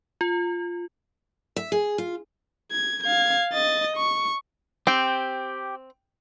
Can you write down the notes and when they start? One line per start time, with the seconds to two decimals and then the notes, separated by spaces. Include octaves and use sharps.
0.21 F4
1.56 E5
1.72 G#4
1.98 F4
2.72 G#6
3.03 F5 G#6
3.53 D#5 A6
3.97 C#6
4.87 C4 G4 G5